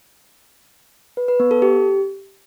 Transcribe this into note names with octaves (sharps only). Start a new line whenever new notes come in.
B4
B4
B3
A4
G4